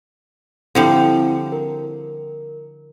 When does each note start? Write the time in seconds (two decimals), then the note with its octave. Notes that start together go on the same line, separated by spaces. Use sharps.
0.75 D3 F3 G3 C4 E4
1.52 A#4